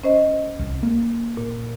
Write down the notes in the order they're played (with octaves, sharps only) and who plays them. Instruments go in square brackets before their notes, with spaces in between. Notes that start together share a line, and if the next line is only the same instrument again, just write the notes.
[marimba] C#4 C5 D#5
[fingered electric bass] C2
A#3
[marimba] A#2